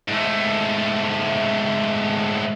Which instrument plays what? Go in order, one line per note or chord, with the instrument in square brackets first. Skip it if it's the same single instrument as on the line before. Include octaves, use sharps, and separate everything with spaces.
[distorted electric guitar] G#2 A3